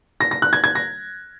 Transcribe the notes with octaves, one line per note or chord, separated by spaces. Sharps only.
A#6
A#6
F#6
G#6
G#6
A#6